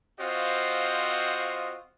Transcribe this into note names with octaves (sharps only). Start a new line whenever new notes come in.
C4 F4 F#4 C5 D#5 F5